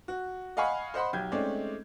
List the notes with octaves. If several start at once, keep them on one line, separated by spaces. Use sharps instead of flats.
F#4
D#5 F5 F#5 G#5 B5 C#6
C5 D#5 F#5 B5 C6
B1 G4 G6 G#6
G#3 A3 C4 C#4 D#4 D5